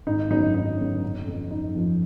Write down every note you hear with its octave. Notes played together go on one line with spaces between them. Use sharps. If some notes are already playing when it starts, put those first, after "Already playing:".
G#1 D#4
F#2 D3 F#3 B3 D#4
G#1 D#4
F#2 D3 F#3 B3
F#1
F2 F3
F#1 D#4
F2 F3